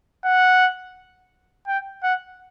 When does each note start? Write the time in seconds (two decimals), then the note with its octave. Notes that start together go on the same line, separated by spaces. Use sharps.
0.25 F#5
1.67 G5
2.03 F#5